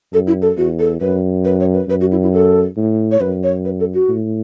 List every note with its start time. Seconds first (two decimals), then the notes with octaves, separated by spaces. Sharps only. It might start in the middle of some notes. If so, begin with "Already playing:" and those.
0.12 F#2 A4
0.27 E4
0.42 A4
0.57 E2 F#4
0.79 A4
1.00 F#2 B4
1.44 B4
1.60 C#5
1.73 B4
1.88 F#2 B4
2.00 F#4
2.11 E4
2.22 E4
2.32 A4
2.77 A2
3.11 C#5
3.20 F#2 B4
3.43 C#5
3.64 B4
3.79 A4
3.94 F#4
4.09 A2